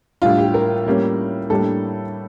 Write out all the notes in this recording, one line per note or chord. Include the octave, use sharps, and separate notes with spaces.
A2 G3 D4 F4
G4
A#4
A2 G3 A#3 C#4
A2 G3 A#3 D4 A4